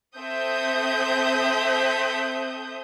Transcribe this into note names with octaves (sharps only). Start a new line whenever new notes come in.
C4 A4 E5 D#6 G6